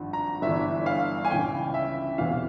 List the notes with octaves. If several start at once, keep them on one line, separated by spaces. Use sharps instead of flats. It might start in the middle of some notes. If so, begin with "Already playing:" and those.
Already playing: G#1 G2 F3
A#5
G1 G2 E3 E5
F5
G#5
C#2 C#3 E3 G5
E5
E1 E2 C3 E3 F5